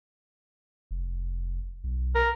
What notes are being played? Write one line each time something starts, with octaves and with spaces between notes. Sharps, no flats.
F1
B1
A#4